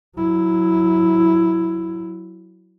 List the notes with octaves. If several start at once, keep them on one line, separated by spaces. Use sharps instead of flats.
F#3 E4